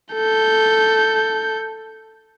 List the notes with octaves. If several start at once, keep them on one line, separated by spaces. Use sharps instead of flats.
A4 G6